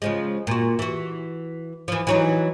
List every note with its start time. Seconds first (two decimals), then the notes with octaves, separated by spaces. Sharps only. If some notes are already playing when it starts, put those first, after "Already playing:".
0.02 C#3 F3 G#3
0.47 A#2 F#4
0.79 E3 F#4
1.88 E3 F3
2.07 E3 F#3 D#4